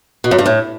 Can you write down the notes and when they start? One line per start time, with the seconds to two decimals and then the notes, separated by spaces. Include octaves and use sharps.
0.24 B2
0.31 F#2
0.38 G2
0.46 A2